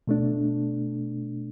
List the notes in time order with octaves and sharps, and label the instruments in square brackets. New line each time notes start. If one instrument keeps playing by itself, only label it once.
[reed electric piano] B2 A3 D4